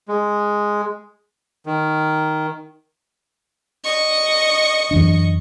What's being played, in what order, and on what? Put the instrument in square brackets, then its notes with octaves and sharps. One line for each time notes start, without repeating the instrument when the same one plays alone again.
[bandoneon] G#3
D#3
[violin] D#5 C#6
[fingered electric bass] F#2 E3 D4